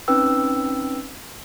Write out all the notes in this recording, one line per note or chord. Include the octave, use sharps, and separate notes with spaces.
C4 C#4 D#4 B4 G5 E6